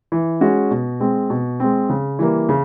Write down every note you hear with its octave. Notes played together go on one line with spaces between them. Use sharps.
E3
G#3 C#4 F#4
B2
G#3 C4
B2
G#3 C4
C#3
E3 G3 A#3
C#3